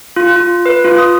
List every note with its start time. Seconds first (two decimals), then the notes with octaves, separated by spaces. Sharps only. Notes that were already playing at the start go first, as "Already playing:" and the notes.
0.16 F4
0.36 F4
0.66 B4
0.85 F4
0.98 D#6